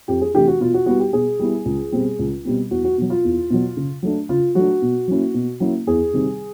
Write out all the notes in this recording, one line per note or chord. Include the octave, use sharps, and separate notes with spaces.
F2 G4
G#4
C3 E3 A3 D4 G4
F#4
B2 F4
F#4
G3 B3 E4 F#4
G4
B2 G#4
G3 B3 E4
C#2
B2 G3 C4
C#2
B2 G3 C4
E2 F#4
F#4
B2 F#3
F4
E2
B2 F#3
C#3
F#3 A3 D4
C#3 F4
F#3 A3 D4 F#4
B2
F#3 A#3 C#4 E4
B2
F#3 A#3 C#4 E4
E2 G#4
C3 D#3 G3 C4